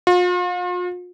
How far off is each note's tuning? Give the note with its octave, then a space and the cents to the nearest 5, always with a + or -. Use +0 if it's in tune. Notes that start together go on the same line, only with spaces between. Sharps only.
F4 +40